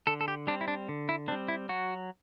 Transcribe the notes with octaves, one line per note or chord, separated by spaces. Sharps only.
D3 A4
A4
G4
G3 C4 D4
E4
D4
D3
E4
G3 C4 D4
E4
F#3 F#4